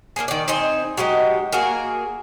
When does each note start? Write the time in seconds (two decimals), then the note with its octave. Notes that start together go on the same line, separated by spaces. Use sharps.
0.16 A#3 B3 D4 G#4
0.28 D#3 D5
0.48 C4 D#4 G#4 C5
0.97 F#3 G#3 D#4 G4
1.52 A#3 F#4 G#4 A#4